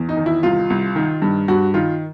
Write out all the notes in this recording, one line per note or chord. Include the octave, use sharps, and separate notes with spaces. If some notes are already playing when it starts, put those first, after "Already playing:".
Already playing: E2
D#4
D#3
E4
C2 F4
C2
D#3
G2
G2 F#4
D#3 F4